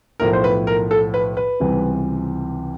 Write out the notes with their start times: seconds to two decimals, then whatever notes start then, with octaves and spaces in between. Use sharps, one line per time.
0.20 B1 A2 F3 A#4
0.33 C5
0.44 B4
0.67 A#4
0.91 A4
1.14 B4
1.37 B4
1.60 C#2 C3 E3 G3